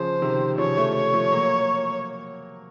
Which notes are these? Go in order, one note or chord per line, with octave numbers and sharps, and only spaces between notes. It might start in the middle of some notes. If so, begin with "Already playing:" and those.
Already playing: C#3 F3 C5
C3 D#3
C#3 F3 C#5
F3 A3
C#5
F3 A3
F#3 A#3